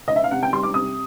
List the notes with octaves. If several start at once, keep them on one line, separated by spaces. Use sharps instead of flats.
D#5
E5
F5
C3 F#5
G5
G3 C6
D6
C3 D#6